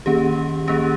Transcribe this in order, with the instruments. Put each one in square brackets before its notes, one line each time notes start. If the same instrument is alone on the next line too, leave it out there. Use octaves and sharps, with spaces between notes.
[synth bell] D#3 A#3 C#4 G4
D#3 A#3 C#4 G4